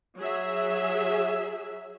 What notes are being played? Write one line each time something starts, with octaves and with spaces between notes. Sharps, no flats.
F#3 G#4 E5